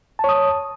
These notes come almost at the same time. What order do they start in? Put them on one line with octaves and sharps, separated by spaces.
A5 C#5 D#6